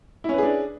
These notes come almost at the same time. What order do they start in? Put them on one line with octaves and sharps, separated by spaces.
E4 C#4 B4 G#4 D4